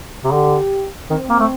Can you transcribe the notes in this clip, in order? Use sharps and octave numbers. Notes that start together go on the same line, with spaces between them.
C3
D3 G4
D#3 C4
A#3
A3